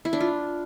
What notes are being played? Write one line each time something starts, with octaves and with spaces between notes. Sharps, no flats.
E4
D4
F4